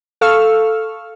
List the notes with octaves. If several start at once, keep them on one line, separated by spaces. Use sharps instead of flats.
A4 F5 C#6 E6 F6